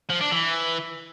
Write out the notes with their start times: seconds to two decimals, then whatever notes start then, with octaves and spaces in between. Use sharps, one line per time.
0.10 F3
0.21 D4
0.32 E3